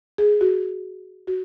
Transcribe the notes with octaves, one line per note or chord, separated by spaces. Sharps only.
G#4
F#4
F#4